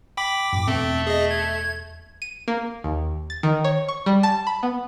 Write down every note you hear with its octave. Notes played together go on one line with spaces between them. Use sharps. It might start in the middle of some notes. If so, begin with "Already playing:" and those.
G5 B5 D6
F#2 A2
E2 B2 A3 B3 C4
G#4 D#5
G#6
D#7
A#3
D#2
A6
D#3
C#5
C#6
G3
A5
B5
B3